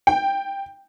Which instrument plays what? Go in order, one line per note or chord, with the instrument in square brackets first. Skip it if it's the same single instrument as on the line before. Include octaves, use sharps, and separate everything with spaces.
[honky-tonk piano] G5